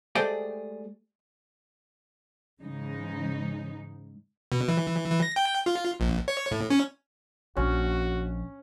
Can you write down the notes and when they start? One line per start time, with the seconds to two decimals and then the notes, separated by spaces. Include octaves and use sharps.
0.15 G#3 A3 G4 G#4 C5 D5
2.60 G#2 C#3 E3 G#3 D#4
4.52 B2
4.68 E3
5.11 E3
5.23 A#6
5.36 G5
5.66 F4
6.00 A#1
6.28 C#5
6.51 A2
6.70 C#4
7.57 A#1 C#4 F#4